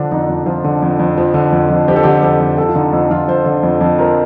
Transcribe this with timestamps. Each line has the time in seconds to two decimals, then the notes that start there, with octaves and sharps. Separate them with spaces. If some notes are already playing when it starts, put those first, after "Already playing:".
Already playing: D3 F3 D4
0.11 F2 D#4
0.29 F2
0.46 F3 F4
0.64 D3
0.82 F2
0.99 F2
1.18 F3
1.34 D3
1.52 F2
1.70 F2
1.88 F3 G4
1.96 A4
2.03 D3 G4
2.22 F2 A4
2.40 F2
2.57 F3 A4
2.69 F4
2.75 D3 D#4
2.93 F2
3.10 F2 F4
3.28 F3 C5
3.46 D3
3.63 F2
3.81 F2
3.98 F3 A#4